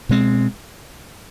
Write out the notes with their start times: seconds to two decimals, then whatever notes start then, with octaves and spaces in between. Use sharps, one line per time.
0.09 B2 G#3 C4